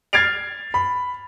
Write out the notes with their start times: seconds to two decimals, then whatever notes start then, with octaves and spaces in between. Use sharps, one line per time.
0.13 F6 G#6 A6 C7 D7 F7
0.74 B5